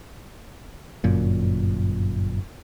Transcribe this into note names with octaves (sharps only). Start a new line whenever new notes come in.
G1 F#2 A#2